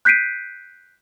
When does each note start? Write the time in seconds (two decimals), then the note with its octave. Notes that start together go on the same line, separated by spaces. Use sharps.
0.05 F#6 G6 B6 C7 D7 D#7